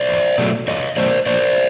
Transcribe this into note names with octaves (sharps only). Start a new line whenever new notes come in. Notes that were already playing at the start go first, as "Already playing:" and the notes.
Already playing: C5 D5
E2
B2 F#3 A3
E2 C#5 D#5
B2 F#3 A3 C5 D5
A#2 C5 D5